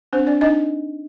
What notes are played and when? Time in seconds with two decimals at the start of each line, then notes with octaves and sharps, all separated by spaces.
0.13 C4 D4 C5
0.27 D4 D5
0.41 D4 D#4 D#5